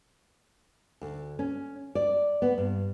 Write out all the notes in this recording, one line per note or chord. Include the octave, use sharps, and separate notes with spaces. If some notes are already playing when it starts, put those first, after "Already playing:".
D2
C#4
D5
B3
G2